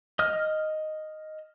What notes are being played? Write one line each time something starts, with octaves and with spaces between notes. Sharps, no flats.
D#5 D#6 F6